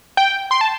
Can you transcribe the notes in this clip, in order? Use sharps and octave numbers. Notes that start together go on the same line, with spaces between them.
G5
C6
A5